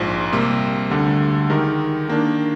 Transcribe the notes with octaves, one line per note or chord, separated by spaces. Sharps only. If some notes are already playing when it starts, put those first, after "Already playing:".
Already playing: A#1 G#2 F3
C3 G3 A#3
D2 D3 G3
D#3 G#3 D#4 G4 A#4
D#3 A#3 D4